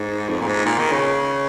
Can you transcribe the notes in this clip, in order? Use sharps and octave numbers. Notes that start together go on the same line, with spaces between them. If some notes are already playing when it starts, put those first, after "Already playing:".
Already playing: G#2
F2
A#2
G#2
A#2
D#3
C#3